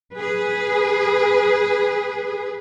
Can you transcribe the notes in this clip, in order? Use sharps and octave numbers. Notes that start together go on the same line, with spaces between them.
G#4 B4